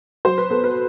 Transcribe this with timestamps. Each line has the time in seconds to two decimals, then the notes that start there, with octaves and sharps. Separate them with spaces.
0.25 F#3 C5
0.38 B4
0.50 B3 A4
0.64 B4